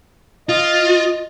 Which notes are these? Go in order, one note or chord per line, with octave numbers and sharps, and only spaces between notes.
F4 D#5